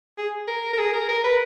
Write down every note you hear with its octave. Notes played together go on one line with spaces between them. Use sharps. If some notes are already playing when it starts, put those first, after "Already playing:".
G#4
A#4
A#4
G#4
A#4
A#4
B4